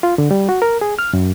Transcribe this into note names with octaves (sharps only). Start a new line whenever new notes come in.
F4
D3
G3
F#4
A#4
G#4
F6
F#2